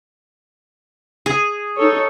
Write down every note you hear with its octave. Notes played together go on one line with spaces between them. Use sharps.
G#4
D#4 A4 C#5